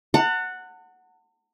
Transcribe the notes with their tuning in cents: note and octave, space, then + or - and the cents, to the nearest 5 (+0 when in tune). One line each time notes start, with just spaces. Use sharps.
F#5 +0 A5 +45